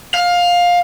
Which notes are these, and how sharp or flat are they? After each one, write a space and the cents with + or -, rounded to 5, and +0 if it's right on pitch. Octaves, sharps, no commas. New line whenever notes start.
F5 +15